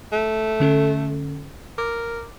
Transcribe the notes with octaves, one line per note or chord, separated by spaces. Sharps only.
A3
D3 C#4 A4
A#4 D6